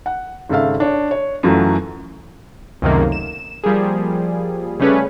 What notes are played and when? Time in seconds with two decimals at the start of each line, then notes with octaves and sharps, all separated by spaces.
0.06 F#5
0.49 G#1 C#3 A4 E5 F5
0.80 D4 C#5
1.11 C#5
1.43 F#2 E3 F#3 A3 F4
2.82 C#2 F#2 C3 D#3 A3 A#3
3.12 E7
3.64 F3 G3 A#3 G#4
4.80 C#3 G3 A3 C#4 G#4 B4